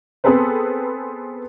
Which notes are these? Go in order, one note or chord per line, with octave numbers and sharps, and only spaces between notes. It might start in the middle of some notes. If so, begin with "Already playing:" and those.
B3 C4 G#4 A4 B4 C5